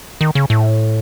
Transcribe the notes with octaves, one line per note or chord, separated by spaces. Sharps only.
D#3
C#3
A2